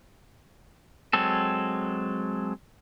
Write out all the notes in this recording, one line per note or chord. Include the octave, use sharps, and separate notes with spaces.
F#3 G#3 C4 A4